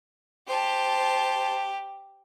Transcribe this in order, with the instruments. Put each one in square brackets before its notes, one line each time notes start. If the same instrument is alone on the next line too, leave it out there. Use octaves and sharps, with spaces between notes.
[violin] G4 [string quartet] C5 A5